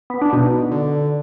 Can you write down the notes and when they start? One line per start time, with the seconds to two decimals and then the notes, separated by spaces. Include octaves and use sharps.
0.10 B3
0.22 D4
0.32 B2 D#4
0.71 D3